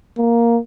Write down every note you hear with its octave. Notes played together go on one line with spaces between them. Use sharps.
A#3